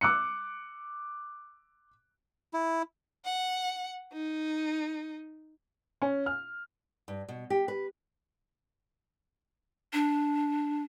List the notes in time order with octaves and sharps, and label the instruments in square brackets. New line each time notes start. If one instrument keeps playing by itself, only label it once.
[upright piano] D6 E6 F#6 C#7
[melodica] E4
[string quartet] F#5
D#4
[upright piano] C#4
F6
[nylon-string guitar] G2
B2
G4
B4
[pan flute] D4